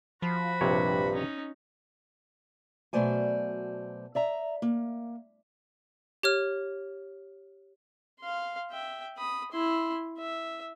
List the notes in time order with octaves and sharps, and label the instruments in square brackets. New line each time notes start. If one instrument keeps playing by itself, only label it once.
[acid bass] F3 [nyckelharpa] F#4 B5
[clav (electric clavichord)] A#1 C3 C#5 [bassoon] G2
[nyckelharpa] C#4 D#4
[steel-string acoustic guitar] B2 F#3 A3 C5 D5 G#5
D5 E5 A#5
A#3
[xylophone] G4 C#5 F6
[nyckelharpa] F5 C6
E5 G5
B5 D#6
E4 C6
E5